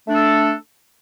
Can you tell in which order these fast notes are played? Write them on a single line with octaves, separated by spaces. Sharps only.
A3 D4 A4